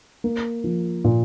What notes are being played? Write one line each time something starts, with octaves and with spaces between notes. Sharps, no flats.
A#3
F3
A#2